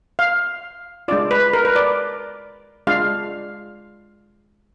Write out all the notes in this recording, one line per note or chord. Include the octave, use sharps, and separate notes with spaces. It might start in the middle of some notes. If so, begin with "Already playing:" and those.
F5
G#3 D4 F4 D5
B4
A#4
B4
D5
G#3 D4 F4 F5